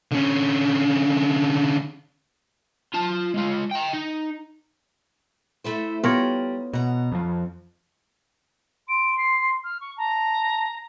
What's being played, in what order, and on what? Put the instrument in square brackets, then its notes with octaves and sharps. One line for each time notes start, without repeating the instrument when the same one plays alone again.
[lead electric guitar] D3 C#4
[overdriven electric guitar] F4 A5
G#3 F4
G5 A#5
D#4
[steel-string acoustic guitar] A3 E4 C5
[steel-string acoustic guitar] G3 [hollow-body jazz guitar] B3 [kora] F4 A#4 C#5
[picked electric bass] B2 [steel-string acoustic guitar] F#5 A#5
[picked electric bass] F2 F3
[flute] C6 [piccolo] D7
[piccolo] C7
F6
C#6
[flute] A5 [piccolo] A#5